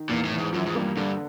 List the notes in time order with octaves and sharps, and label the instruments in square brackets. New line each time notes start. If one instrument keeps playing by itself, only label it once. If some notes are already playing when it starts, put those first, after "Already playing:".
Already playing: [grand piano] D#3
[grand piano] E2 [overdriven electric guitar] A#2
[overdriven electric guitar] A2
[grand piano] E2
[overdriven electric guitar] G#2
[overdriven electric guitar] F#2 [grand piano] F3
[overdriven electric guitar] G#2
[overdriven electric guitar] G2 [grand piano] A#3
[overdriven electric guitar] G2 [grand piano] D3